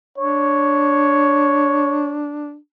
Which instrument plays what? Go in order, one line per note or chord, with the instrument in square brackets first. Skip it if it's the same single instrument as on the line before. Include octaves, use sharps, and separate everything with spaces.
[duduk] D4 [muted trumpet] C#5